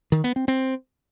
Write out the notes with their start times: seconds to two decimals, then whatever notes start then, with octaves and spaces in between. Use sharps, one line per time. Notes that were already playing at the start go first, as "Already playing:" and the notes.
0.12 D#3
0.24 B3
0.36 C4
0.48 C4